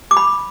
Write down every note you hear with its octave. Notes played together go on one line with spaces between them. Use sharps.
D6
B5